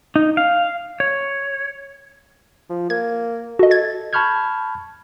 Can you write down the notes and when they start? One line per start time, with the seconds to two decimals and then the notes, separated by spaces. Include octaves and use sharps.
0.16 D#4
0.37 F5
1.00 C#5
2.70 F3
2.90 A#3 G#6
3.59 F#4 A4 D#5
3.71 G#6 A6
4.13 A5 B5 C#6 F6 G6 G#6